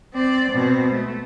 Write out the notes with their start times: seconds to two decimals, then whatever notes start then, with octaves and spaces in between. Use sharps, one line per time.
0.13 C4 D5
0.52 B2 C4
0.91 A3